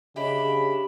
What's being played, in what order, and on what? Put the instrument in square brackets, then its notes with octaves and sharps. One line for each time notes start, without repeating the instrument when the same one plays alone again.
[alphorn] C#3 [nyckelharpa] D4 B5 [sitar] G4 [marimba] C#5 D#5 E5